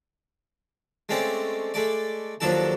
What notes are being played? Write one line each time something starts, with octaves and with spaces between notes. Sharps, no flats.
G#3 A3 C4 C#4 D5
G#3 A3 D5
D#2 F3 F#3 D4 A4 A5